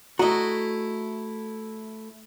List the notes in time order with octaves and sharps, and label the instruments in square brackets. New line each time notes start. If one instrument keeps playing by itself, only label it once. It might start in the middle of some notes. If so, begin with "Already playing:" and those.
[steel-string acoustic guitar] A3 E4 [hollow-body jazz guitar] F#4 D#5 [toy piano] A#5